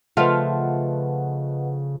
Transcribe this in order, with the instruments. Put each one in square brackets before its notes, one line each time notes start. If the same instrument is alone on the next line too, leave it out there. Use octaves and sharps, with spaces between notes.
[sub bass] C#3 [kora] F3 A3 [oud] F4 [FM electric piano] B4 D#5 F#5